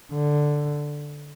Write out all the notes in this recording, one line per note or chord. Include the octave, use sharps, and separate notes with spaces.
D3